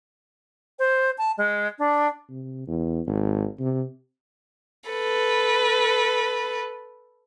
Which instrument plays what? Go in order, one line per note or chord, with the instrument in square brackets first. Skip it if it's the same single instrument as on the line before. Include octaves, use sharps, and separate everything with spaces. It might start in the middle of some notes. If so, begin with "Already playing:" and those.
[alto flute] C5
A5
G#3
D4
[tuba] C3
E2
G#1
C3
[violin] A4 B4